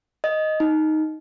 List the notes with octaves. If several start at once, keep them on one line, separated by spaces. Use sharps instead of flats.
D#5
D#4